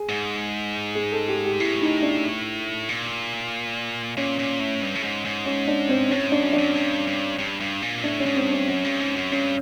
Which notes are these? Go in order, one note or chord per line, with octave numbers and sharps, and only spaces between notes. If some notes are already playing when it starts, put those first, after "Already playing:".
Already playing: G#4
G#2
G#4
A4
G4
G4
A2 E4
D#4
D4
A#2
A#2 C#4
A#2
A2
G2
A2
G#2
G#2
C#4
D4
C4
A2 C#4
G#2 D4
F#2
D4
F#2
G2
G2
G2
G2
A#2
A2 D4
C#4
G#2
C4
G2
C#4
F#2 C#4
G2
G#2
F#2
G2 C#4